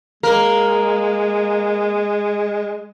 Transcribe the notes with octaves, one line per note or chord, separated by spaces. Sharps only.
G#3 A#3 A#4